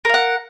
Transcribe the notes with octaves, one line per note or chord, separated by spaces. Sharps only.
A#4 F5 F#5